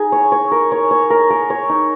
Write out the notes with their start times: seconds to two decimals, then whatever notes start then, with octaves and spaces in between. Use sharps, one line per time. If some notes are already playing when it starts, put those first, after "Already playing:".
Already playing: D#4 G#4
0.12 C#5
0.32 C#5
0.52 A#4
0.72 C#5
0.91 C#5
1.10 A#4
1.30 A#4
1.50 C#5
1.69 D#4